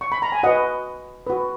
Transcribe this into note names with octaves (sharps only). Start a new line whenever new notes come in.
C#6
B5
A#5
G#5
F#4 B4 D#5 F#5
F#4 B4